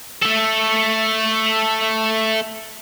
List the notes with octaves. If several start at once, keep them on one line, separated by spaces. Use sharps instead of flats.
A3 A4